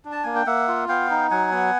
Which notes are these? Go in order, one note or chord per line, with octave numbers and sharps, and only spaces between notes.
D4
A5
A#3 G#5
G5
A#3 E5 F#5
F4
B3 F5 G5
D#4
F#3 F#5 G#5
B3